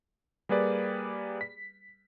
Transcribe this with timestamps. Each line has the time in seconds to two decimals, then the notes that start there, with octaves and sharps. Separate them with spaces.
0.49 G3 A#3 G#4 B4 D5
1.41 B6